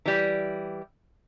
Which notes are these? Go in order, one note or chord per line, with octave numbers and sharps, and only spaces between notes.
E3 G3